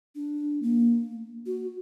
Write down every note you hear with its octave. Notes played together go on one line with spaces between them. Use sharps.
D4
A#3
F#4